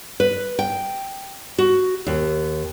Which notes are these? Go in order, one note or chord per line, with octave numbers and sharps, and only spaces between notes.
B4
G5
F#4
D#2